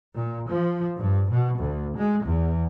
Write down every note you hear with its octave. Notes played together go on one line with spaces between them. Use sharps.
A#2
F3
G2
B2
D2
G#3
E2